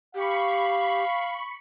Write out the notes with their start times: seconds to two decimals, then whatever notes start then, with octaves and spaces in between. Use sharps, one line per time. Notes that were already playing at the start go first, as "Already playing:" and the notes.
0.15 G4 F5 B5 C#6 C#7